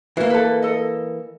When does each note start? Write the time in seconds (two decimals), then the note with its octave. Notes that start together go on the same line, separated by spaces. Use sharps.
0.17 E3 A#3 F#4
0.30 A4 B4
0.62 A4 D#5